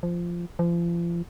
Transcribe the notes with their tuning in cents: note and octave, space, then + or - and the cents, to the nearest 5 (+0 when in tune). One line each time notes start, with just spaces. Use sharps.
F3 -10
F3 -35